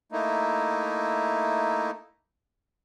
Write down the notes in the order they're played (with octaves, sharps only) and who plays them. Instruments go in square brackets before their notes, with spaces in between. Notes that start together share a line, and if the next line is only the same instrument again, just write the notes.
[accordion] A3 A#3 D#4 E4